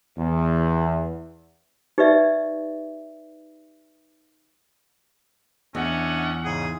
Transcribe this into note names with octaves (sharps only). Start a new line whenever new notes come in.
E2
D#4 G4 B4 D5 E5
E2 C#4 D4 D#5 E5 F#5
G#2 C#3 G#4